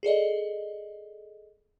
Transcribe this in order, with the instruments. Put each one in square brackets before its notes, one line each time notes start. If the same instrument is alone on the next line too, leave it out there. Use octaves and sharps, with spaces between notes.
[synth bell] G#4 A4 D5 D#5